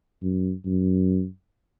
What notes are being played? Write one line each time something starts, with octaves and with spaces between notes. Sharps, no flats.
F#2
F#2